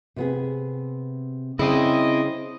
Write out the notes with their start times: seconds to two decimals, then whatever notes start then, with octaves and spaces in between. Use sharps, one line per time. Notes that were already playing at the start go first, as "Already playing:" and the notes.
0.16 C3 B3 G#4
1.59 C#3 C4 C#4 E4 D#5